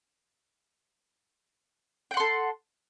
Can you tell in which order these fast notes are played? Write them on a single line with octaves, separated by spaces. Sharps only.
G5 F#5 C6 A4